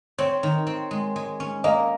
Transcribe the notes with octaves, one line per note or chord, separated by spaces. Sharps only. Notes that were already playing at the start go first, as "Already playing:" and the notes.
C4 C#5
D#3
C4
G#3
G#3
C#4
A#3 D#5